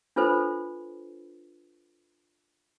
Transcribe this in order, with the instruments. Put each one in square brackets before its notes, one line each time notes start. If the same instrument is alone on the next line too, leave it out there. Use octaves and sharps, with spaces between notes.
[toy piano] D4 F4 A4 B4 C5 B5